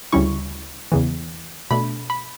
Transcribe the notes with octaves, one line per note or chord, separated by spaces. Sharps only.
D2 C#3 G3 C#4 E4 C#6
E2 C#3 E3
B2 A3 D4 B5
B5